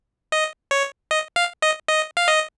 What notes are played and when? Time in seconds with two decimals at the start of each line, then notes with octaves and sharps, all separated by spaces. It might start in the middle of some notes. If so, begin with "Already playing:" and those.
0.32 D#5
0.71 C#5
1.11 D#5
1.36 F5
1.62 D#5
1.89 D#5
2.17 F5
2.28 D#5